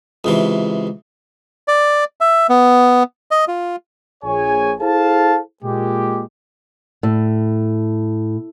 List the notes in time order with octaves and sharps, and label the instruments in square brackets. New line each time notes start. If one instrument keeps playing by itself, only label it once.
[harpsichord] C#2 C3 E3
[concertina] D5
E5
B3
D#5
F4
[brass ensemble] A#1 G#4 C#5 G#5
E4 G#4 A4 C5 F5 A5
A#2 G#3 G4
[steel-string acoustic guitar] A2